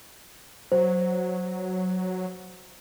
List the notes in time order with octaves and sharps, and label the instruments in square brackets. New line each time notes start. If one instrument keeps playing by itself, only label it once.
[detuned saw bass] F#3 [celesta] C5